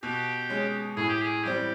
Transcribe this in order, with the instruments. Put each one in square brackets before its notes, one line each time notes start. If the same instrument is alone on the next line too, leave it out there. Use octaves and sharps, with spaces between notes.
[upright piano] B2 [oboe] G4
[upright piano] G#3 C#4
[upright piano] A2 [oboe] G#4
[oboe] G4
G#4
[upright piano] E3 G3 C4 [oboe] G4